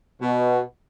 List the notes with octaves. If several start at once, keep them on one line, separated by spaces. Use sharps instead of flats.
B2